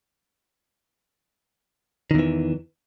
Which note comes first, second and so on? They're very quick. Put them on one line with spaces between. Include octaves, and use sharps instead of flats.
D#3 E2 E3